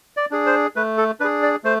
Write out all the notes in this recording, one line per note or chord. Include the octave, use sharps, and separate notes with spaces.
D5
D4 G#4
C5
A3 B4
A4
D4 G#4 B4
D5
A3 C5